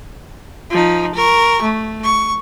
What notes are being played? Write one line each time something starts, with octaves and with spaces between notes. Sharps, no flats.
F3 D#4
A#4 C#6
A3
C#6